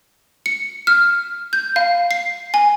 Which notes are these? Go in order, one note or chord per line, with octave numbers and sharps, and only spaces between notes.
C#7
F6
G6
F5
C7
G#5